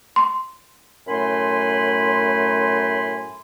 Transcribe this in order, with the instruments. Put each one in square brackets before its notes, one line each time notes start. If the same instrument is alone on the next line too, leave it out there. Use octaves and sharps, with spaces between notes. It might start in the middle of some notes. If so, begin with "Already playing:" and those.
[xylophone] C6
[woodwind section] F#2 A2 A3 G#5 B5 C6